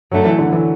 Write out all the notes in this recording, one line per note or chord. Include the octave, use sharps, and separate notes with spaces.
F#2 D3 F#3 A3
E3
D3
E3